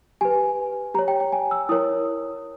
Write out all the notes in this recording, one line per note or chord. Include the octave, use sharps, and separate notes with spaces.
G4 B4 G#5
G4 C#5 A#5
G5
G5
G#5
E6
E4 A#4 C#5 D#6